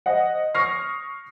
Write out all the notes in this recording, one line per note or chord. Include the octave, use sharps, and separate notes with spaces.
C5 D#5 F#5
C#6 D#6 F6 A#6 C7